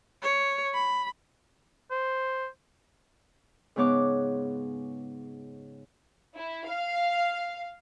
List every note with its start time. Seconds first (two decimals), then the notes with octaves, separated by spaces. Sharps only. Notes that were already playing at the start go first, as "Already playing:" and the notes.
0.23 C#5
0.74 B5
1.91 C5
3.76 G#2 C#3 B3 C#5 D6 F#6
6.36 E4
6.67 F5